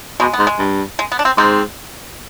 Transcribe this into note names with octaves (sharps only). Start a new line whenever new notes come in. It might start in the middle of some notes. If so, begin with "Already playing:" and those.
B2 G#3
B3
G#2
G#3
G2
G#3
B3
D4
C4
G#2 C4